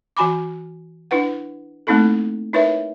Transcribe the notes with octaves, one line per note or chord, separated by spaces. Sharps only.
E3 F#4 G#5 B5 D6
D4 E4 B4 F#5
A3 A#3 C4 D#4 E4 A4
D#4 E4 A#4 B4 C#5 E5